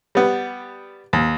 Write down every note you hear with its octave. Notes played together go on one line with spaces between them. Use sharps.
G3 B3
D#2